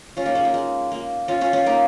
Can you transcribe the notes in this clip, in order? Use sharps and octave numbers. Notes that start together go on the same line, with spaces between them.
C#4 F4
A#3 D#4
G#3 C#4
A#3
G#3
A#3
C#4 F4
C#4 F4
C#4 F4
A#3 D#4